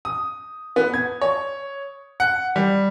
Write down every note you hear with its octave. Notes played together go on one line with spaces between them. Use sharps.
D#6
B3
G#6
C#5
F#5
G3